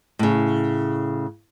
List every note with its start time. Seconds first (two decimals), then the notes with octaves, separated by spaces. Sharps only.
0.19 A2 C#3